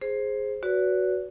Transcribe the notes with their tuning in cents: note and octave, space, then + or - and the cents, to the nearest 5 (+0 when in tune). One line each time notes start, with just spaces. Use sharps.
G#4 +0 C5 +10
F#4 +0 B4 +0 D5 -40